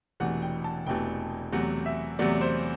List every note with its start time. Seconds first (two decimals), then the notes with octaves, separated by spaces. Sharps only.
0.20 E1 E2 C3 E3 A3 F#5
0.42 G5
0.64 A5
0.87 E1 E2 C3 E3 A3 G5
1.52 E2 C3 F#3 A3 F#5
1.86 E5
2.19 E2 C3 F#3 A3 D5
2.41 C5